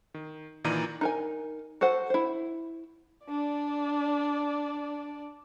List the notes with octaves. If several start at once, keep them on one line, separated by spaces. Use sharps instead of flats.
D#3
A#2 D#3 E3 D5 A#5 D#7
D#4 A#4 G#5
F#4 A4 C5 F#5
E4 C5
D4 D5